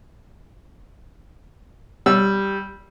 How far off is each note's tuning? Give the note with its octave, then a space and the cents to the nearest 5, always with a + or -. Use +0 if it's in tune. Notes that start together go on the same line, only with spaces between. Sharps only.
G3 +0 E6 +0